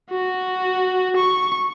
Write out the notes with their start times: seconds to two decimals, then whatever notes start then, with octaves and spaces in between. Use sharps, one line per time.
0.11 F#4
1.16 C#6